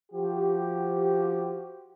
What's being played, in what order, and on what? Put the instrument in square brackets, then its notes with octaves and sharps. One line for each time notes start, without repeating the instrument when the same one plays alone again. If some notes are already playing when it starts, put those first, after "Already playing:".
[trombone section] F3 F#4 G4